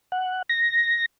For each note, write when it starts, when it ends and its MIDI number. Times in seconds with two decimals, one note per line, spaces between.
0.12 0.42 78
0.49 1.06 94